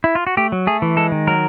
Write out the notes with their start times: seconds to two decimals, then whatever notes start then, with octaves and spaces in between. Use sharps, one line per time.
0.04 E4
0.15 F4
0.27 F#4
0.37 A3 G4
0.52 F#3
0.67 A3 G#4
0.82 E3
0.97 G#3 A4
1.12 D#3
1.27 F#3 A#4